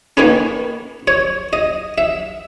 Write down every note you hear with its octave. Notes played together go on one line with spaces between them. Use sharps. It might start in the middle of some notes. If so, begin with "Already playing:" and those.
D#3 A#3 C#4 B4
C#5
D#5
E5